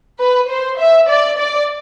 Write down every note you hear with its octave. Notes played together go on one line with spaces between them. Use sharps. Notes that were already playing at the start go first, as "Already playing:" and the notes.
B4
C5
E5
D5
D5